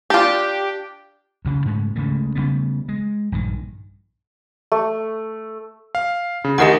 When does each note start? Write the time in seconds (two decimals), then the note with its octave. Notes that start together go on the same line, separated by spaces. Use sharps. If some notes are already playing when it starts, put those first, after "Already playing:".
0.10 D4 F4 G4
1.45 D2 C#3
1.65 G#2 C#3 G#3 A3
1.96 D2 C#3 G#3 A3
2.35 C#3 G3 A3 B3
2.89 G#3
3.32 A#1 G2 D#3
4.72 A3
5.95 F5
6.44 C#3
6.58 D2 D#3 G4 A#4 D#5 F#5